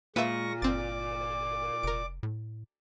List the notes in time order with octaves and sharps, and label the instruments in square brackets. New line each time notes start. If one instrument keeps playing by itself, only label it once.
[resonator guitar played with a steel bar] A#2 [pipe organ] G#3 C#6 A#6 [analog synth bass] A#3 [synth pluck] B4 E5
[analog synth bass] G1 [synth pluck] C4 A6 [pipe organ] D5 D6
[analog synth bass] F1 [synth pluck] A#4 D7
[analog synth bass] A2